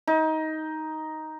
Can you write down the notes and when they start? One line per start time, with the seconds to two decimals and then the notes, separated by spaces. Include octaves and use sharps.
0.07 D#4